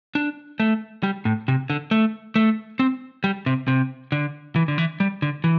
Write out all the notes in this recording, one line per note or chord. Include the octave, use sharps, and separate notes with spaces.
D4
A3
G3
A2
C3
D3
A3
A3
C4
G3
C3
C3
D3
E3
D3
E3
G3
D3
E3